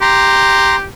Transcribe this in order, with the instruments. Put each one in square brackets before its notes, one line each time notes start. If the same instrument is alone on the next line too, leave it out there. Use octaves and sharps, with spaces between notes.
[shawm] G4 [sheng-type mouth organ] A#5 C6